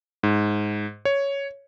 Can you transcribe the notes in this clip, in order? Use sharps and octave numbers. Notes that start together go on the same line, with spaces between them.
G#2
C#5